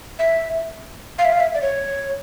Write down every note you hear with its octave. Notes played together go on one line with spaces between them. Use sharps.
E5
F5
E5
F5
E5
D5
C#5